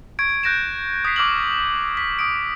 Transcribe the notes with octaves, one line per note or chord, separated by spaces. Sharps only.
C#6 G#6 D7
F#6 G6 A#6 D7 E7
D#6 G#6 B6 C7
C#6 D6 E6 F6 A#6 F#7
B6
D#6 D7